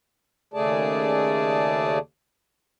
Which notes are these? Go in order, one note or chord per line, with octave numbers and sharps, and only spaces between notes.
D#2 C#3 A3 G#4 D5 A5